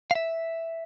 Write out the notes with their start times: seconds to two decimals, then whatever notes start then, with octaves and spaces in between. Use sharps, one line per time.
0.11 F5
0.15 E5